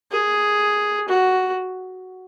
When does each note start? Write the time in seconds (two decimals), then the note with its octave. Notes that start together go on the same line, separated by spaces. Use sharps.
0.11 G#4
1.09 F#4